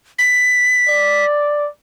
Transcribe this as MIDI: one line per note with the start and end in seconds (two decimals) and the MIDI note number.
0.19 1.25 95
0.89 1.69 74